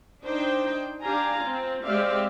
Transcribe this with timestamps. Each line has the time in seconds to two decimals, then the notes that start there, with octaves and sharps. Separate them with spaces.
0.25 D4 D#4 C5 G5
1.02 D4 G4 F5 G#5 A#5
1.41 C4 F4
1.84 G#3 C4 G4 D5 E5 F5